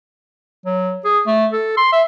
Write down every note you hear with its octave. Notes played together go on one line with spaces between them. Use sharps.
F#3
G#4
A3
A4
C6
E5